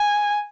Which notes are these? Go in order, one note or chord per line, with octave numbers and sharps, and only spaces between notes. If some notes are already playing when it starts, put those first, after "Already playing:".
Already playing: G#5